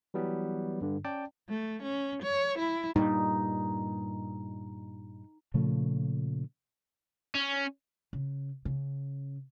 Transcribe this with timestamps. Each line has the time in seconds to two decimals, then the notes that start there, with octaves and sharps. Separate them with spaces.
0.14 E3 F#3 G3 B3
0.81 G2 D3
1.04 C#4 D5 G5 A5
1.49 A3
1.83 C#4
2.23 C#5
2.59 E4
2.96 G2 A#2 G3 D#4
5.54 A#2 C#3 F3 A3
7.35 C#4
8.13 C#3
8.65 C#3